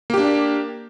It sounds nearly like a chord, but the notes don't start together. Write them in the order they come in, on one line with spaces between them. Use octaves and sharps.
A#3 G4 D4